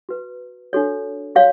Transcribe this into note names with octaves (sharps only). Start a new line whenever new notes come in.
F#4 B4
D4 F#4 A4 C#5
F#4 C#5 F5